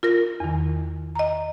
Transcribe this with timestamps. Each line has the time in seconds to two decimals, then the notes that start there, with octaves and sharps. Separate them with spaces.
0.03 F4 A#4 A#6
0.40 E2 D#3
1.15 D#5 A#5